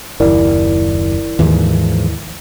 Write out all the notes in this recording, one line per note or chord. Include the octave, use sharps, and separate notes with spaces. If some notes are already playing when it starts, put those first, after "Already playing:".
F#1 D#2 E4 A#4 D5
D#2 G#2 E3 F3